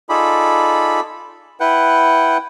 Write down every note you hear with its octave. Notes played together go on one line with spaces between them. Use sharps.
D#4 F4 G#4 A4 D5 B5
E4 B4 F#5 G5